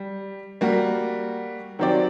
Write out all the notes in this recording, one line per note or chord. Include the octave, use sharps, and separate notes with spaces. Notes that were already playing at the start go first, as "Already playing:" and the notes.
Already playing: G3
G3 A#3 F#4
D#3 F#3 C4 G4 D5